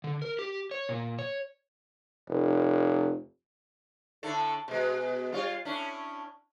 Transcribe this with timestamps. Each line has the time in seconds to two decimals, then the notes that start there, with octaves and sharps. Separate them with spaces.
0.04 D3
0.22 A#4
0.39 G4
0.71 C#5
0.89 A#2
1.19 C#5
2.29 F1
4.23 A2 D3 A4
4.68 B2 G#3
5.32 G3 F4 C#5
5.65 A2 C#4 D4